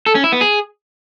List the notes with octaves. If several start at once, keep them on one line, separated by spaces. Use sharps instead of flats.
A4
C#4
E4
B3
G#4